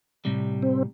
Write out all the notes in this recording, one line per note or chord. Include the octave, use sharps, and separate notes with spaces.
A2 C3 G3
C4